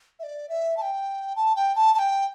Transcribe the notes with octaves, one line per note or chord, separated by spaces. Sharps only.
E5
D5
E5
A5
G5
A5
G5
A5
A5
G5